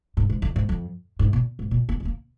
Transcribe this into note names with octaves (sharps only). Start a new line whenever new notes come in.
G#2
G#2
F2
G#2
F2
G#2
A#2
G#2
A#2
A#3
G#3
A#3